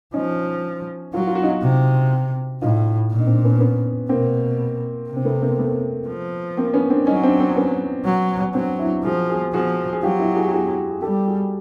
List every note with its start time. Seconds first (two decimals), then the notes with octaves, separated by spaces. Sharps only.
0.14 F3 C#4 D#4
1.13 F#3 F4
1.20 F#4
1.27 F4
1.35 F#4
1.43 D#4 F4
1.63 C3
2.62 A2 D#4 F4
3.11 A#2
3.19 D#4
3.27 C4 D4
3.44 B3 C#4
3.60 B3 C#4
4.09 B2 A#3 C4
5.09 C3
5.16 C4
5.25 A3 B3
5.42 A#3 C4
5.58 A3 B3
6.08 F3
6.57 A#3 C4
6.74 B3 C#4
6.90 C4 D4
7.07 F#3 C#4 D#4
7.23 C4 D4
7.39 C4 D4
7.56 B3 C#4
8.05 F#3
8.54 F#3 C4 D4
8.79 D4 E4
9.04 F3 F#4 G#4
9.29 F#4 G#4
9.54 F3 F#4 G#4
9.93 G#4
10.03 F#3 F4 G4
10.19 E4 F#4
10.36 F#4 G#4
10.45 G4
10.53 F#4 G#4
10.90 G#4
11.02 G3 G4 A4
11.27 F#4 G#4